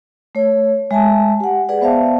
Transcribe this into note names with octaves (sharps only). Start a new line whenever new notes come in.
A3 C#5
G#3 E5 G#5 A5
G4 F#5
G#4 B4 D5 F#5
B3 C5 E5 F5 A5